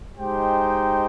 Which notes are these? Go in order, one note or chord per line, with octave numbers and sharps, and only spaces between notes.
G#3 D#4 G4 C5 G5